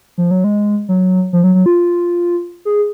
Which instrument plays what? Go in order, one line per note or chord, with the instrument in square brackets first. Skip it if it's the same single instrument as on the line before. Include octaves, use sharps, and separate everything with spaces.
[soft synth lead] F3
F#3
G#3
F#3
F3
F#3
F#3
F4
G#4